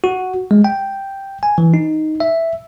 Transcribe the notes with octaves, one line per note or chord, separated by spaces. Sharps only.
F#4
G#3
G5
G#5
E3
D#4
E5